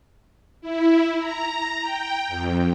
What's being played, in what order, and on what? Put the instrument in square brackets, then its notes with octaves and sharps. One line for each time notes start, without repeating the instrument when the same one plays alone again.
[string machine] E4
A#5
G5
F2